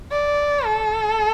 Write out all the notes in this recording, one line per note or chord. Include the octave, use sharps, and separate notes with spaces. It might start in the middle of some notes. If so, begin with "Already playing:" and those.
D5
A4